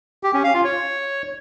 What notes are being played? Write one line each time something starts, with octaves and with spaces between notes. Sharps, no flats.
G4
C#4
F5
F4
C#5